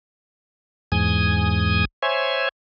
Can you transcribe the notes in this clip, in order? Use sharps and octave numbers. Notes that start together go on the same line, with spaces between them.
E2 G#2 G#5 D#6
C5 C#5 E5 G#5